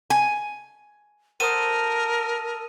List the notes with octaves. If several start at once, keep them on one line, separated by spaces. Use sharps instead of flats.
G#5
F#4 A4 A#4 C5 D#6 D#7